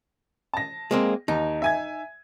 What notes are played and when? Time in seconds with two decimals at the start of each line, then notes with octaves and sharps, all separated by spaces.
0.54 A5 A#6
0.91 G#3 A#3 C4
1.28 D#2 D#4
1.62 E5 G#5 G#6